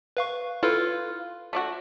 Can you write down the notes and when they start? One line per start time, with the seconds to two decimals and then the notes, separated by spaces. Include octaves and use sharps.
0.17 B4 F5 C#6
0.63 E4 F4 A4 B4
1.53 A3 D4 F#4